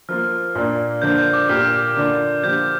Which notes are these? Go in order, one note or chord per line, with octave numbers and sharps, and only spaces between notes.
F3 A#3 F4 F6
A#2 A#3 D4
D3 F3 A#3 D4 G6
G6
D6
A#2 A#3 G4 F6
D3 A#3 D4 F4
D3 F3 A#3 G4 G6